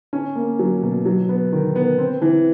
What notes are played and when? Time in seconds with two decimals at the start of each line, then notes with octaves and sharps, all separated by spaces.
0.13 C#4
0.35 A#3
0.59 F#3
0.82 B2
1.06 F#3
1.29 B3
1.52 D#3
1.76 B3
1.98 C4
2.22 E3